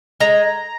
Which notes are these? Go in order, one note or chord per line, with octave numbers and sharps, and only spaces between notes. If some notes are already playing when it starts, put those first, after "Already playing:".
G#3 A#5